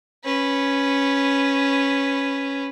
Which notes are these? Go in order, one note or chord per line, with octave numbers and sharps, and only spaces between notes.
C#4 B4